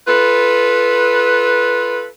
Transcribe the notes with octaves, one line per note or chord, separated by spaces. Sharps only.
F4 A4 B4